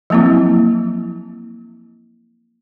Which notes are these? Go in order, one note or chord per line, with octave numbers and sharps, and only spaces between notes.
F3 F#3 A#3 C4 E4